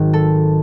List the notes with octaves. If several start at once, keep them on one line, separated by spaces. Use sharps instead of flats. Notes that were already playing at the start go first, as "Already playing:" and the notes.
Already playing: G#1 G#2 D#3 F#3
A4